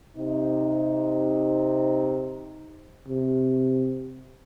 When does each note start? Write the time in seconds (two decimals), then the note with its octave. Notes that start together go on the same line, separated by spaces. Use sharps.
0.15 C3 D#4
3.08 C3